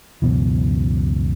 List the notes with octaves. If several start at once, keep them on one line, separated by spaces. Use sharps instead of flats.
C#2 F#2 B2 E3